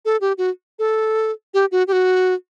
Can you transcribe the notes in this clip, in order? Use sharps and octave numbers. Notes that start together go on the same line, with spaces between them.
A4
G4
F#4
A4
G4
F#4
G4
F#4